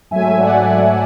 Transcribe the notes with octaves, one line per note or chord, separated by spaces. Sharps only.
G#2 F#3 A3 E5 G#5
D5 F#5